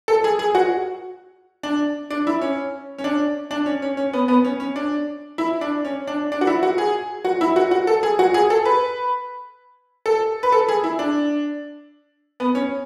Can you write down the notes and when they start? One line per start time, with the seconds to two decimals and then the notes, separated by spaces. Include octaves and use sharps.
0.08 A4
0.24 G#4
0.39 G#4
0.55 F#4
1.63 D4
2.10 D4
2.27 E4
2.41 C#4
2.98 C#4
3.04 D4
3.51 D4
3.66 C#4
3.82 C#4
3.97 C#4
4.13 B3
4.28 B3
4.45 C#4
4.60 C#4
4.76 D4
5.38 E4
5.61 D4
5.85 C#4
6.07 D4
6.32 D4
6.41 F#4
6.47 E4
6.63 F#4
6.78 G#4
7.25 F#4
7.41 E4
7.56 F#4
7.71 F#4
7.87 A4
8.03 G#4
8.19 F#4
8.34 G#4
8.50 A4
8.65 B4
10.06 A4
10.43 B4
10.52 A4
10.68 G#4
10.84 E4
10.99 D4
12.40 B3
12.55 C#4